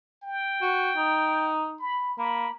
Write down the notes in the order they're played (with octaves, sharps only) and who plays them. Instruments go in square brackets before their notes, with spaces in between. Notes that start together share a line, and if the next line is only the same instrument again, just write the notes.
[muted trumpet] G5
[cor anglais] F#4
D#4
[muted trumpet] B5
[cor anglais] A#3 [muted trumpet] B5